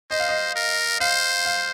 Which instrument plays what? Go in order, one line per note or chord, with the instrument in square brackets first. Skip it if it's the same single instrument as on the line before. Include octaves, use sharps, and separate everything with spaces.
[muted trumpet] C5 [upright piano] D#5
[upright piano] F5
D#5
[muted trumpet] A#4
[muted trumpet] C5 [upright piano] F5
[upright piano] F5